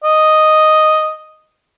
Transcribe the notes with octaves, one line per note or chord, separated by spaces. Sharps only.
D#5